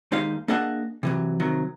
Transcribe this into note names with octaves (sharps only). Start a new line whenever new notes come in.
D#2 G#3 D#4 G4 F5
A#3 D4 G#4 D#5 E5 F#5
C3 E3 F#3
C3 D#3 F#3 A#4